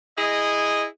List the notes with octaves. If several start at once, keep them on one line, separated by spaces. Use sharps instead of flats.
E4 G#4 D#5